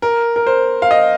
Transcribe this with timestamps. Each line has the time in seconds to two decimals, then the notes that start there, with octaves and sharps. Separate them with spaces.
0.02 A#4
0.36 A#4
0.47 C5
0.82 F5
0.91 D#5